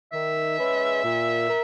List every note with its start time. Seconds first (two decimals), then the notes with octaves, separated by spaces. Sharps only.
0.12 D#3 E5
0.58 G#3 C#4 G#4 B4
1.04 A#2
1.49 A#4